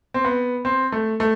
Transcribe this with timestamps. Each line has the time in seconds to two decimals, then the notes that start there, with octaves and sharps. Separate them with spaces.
0.14 C4
0.25 B3
0.65 C4
0.92 A3
1.20 A3